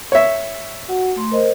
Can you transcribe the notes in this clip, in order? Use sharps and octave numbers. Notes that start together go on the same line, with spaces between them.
C#5 E5
F#4 F#5
A3 C6
A#4 C5 D#5